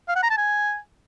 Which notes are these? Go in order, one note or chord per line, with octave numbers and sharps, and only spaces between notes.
F5
F#5
A#5
A5
G#5